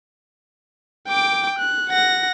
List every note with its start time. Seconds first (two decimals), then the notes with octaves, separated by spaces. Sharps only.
1.08 G5 D6
1.59 F#6
1.89 F#5 A#6